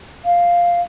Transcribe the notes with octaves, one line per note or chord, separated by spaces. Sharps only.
F5